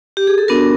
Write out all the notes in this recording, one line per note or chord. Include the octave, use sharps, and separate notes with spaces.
G4
G#4
A4
B3 D4 F#4 A#4